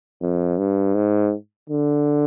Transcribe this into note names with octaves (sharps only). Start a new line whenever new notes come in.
F2
G2
G#2
D3